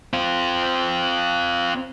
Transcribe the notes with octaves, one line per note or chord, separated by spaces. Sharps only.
C4 F4